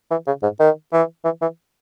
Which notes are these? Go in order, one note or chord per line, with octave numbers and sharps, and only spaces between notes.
E3
C#3
G#2
D#3
E3
E3
E3